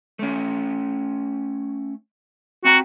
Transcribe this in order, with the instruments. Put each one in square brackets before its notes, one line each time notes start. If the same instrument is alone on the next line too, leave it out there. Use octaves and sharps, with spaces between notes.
[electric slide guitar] A3 C#4
[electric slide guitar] C4 F#5 A#5 [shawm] F#4